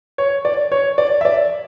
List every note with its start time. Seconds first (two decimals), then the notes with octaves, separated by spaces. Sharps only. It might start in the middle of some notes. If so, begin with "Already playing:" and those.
0.18 C#5
0.45 D5
0.72 C#5
0.98 D5
1.21 E5
1.25 D5